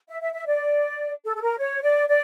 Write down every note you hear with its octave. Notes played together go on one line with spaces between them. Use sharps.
E5
E5
E5
D5
A4
A4
A#4
C#5
D5
D5